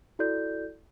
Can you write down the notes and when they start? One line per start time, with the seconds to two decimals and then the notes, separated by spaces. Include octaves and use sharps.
0.19 E4 F#4 A4 D5 G6